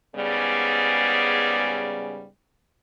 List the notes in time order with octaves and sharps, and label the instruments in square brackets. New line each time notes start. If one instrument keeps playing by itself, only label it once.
[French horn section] G#2 C#3 G3 B3 G#4 D5